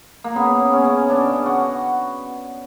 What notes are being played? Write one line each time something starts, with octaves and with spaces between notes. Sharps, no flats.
A#3
C#3 B3
C#3
C#4
C#3
C#3 D4
C#3
F#4